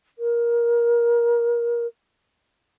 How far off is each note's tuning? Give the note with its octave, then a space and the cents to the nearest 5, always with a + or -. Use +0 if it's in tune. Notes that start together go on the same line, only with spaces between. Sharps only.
A#4 +20